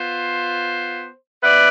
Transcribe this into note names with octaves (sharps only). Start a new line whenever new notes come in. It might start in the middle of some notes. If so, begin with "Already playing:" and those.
Already playing: B3 F4 C5
B3 E4 B4 D5